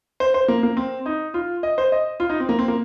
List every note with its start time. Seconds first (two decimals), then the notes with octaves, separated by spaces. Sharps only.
0.20 C5
0.34 C5
0.48 A#3
0.63 A#3
0.77 C4
1.06 D#4
1.34 F4
1.63 D#5
1.78 C5
1.92 D#5
2.20 F4
2.29 D#4
2.40 C4
2.49 A#3
2.59 C4
2.68 A#3